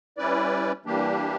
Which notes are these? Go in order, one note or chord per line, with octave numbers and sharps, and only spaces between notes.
G3 C#4 E4 B4 D5
E3 G3 A#3 D4 G4